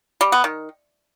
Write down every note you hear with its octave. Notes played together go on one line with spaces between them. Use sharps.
G3
B3
D#3